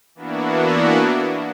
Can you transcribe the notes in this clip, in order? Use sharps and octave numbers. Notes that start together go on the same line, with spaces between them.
E3 A#3 B3 D4 E4 F#4